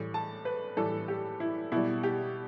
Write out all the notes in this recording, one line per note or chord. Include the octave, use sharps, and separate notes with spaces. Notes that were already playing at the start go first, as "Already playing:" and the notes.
Already playing: A2 E3 G3
A5
B4
A2 E3 G3 A4
G4
E4
B2 G3 E4
G4